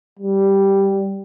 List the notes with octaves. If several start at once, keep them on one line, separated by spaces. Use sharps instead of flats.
G3